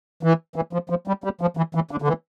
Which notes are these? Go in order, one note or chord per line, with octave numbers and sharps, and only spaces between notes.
E3
E3
F3
F3
G3
G3
F3
E3
E3
D3
D3
E3